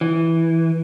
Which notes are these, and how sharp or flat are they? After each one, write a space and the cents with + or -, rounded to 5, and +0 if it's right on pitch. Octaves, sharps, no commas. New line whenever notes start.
E3 -5